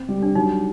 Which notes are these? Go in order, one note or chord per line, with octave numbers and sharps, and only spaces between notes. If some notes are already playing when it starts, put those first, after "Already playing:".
Already playing: C4
G3
D4
F#3 D#4